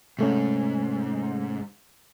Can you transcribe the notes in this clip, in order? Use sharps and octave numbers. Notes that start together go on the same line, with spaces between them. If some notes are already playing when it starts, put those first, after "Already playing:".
G#2 C3 A3 C#4